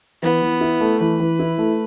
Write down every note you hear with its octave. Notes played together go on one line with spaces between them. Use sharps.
E3 B3
E3
E4
A3
E3 B4
E3
E4
A3